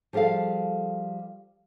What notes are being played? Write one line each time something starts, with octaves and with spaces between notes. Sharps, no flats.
F3 G3 G#4 A4 F5